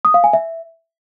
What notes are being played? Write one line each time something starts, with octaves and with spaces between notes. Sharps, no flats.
D#6
F5
G#5
E5